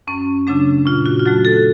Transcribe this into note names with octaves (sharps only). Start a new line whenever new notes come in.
F#2 C#4
C#3 F#3 A3 D4
A#2 F4
F#4
F4
F#3 A3 F#4
A4